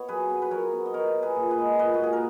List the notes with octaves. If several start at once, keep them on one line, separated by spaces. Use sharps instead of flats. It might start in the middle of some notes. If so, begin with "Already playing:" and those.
Already playing: B3 C#5 D#5
F#3 G#4 B4
B3
B4
F#3 A#4 C#5
B3
D#5
B3 A#4 C#5
B3
G#4 B4
A#2
B4 D#5
G#3
A#2 B4 D#5
F#4
A#2 G#4
A#4